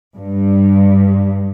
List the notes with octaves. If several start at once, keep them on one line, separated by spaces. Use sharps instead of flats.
G2